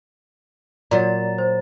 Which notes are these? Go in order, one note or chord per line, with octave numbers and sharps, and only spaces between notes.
A#2 F#3 D5 A#5 A6
C5